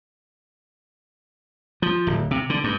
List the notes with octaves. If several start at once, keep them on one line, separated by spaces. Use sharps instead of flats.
F3
D1
C3
D3
G2